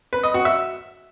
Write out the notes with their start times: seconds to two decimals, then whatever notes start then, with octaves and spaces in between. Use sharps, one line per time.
0.13 B4
0.23 D#5
0.34 F#4
0.45 E5